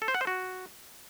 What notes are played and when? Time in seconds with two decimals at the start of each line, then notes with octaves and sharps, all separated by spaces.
0.02 A4
0.08 C5
0.14 F#5
0.21 C5
0.27 F#4